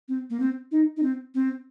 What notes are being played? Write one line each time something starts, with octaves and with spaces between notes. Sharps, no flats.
C4
A#3
C4
D#4
D#4
C4
C4